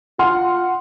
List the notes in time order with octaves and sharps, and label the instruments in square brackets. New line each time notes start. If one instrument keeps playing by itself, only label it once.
[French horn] F4 [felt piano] F#5 C6 F6